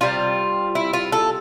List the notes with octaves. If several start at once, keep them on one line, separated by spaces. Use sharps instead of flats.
C3 G3 F4
E4
F4
A4